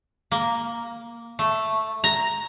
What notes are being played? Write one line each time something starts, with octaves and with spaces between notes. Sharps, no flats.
A#3
A3
A#5